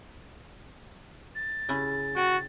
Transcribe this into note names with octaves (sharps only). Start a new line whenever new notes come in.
A6
C#3 C#4 E4
F#4 G5